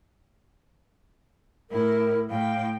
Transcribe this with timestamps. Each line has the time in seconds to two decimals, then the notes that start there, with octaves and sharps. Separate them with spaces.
1.71 A2 E4 A#4
2.30 A2 F5 G5